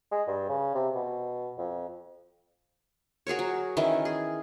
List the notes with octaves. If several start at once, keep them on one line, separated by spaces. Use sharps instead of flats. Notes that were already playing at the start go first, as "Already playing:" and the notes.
G#3
G2
C#3
C3
B2
F2
F#4 G#4 A#4 C#5
F#3
D#3 E3 C#4 E4
G#4